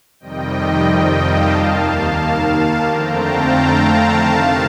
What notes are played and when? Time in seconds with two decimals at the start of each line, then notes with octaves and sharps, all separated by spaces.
0.20 F2 C3 D#3 G3 D#5 G5
0.85 D#5 G5
1.18 F5 A5
1.51 D#2 D#3 A#3
2.82 F2 D3 A3 C4 G5 A#5
3.16 F5 A5
3.48 G5 A#5
3.82 G5 A#5
4.14 C3 D#3 A3 F5 A5